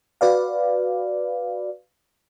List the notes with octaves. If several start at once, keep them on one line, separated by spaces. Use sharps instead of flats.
F#4 B4 D5 F5